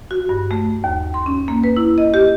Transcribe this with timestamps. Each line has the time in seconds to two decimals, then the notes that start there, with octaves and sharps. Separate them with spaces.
0.11 F#4
0.29 G2
0.51 A3
0.84 D#2
1.14 C6
1.26 C#4
1.48 A#3
1.64 B4
1.77 E4
1.98 D#5
2.14 G4